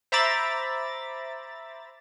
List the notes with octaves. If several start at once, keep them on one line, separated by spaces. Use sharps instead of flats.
C5 E5 A#5 B5 D6 A6